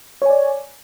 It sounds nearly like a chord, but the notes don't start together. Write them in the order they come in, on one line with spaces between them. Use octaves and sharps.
C#5 G#5 D5